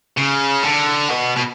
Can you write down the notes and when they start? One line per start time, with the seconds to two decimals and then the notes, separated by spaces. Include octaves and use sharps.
0.17 C#3
0.63 D3
1.09 B2
1.36 B2